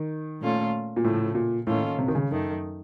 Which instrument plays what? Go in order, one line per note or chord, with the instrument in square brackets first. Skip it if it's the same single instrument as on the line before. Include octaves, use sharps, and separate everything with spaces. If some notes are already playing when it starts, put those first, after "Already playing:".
Already playing: [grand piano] D#3
[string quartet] A#2 A3 C#4 F4 A4
[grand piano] A#2
[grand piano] A2 [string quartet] C#3 F3 A3
[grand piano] A#2
[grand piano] A2 [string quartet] D#3 A#3 C#4 F4 A4
[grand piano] C3
D#3
C#3
[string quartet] F#2 D#3 A3